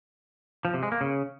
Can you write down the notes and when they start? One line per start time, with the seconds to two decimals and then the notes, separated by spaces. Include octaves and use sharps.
0.65 F3
0.74 C3
0.83 G#3
0.92 A#3
1.01 C#3